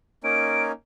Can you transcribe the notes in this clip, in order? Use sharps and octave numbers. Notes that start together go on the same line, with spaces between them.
A#3 C#4 D#4 D7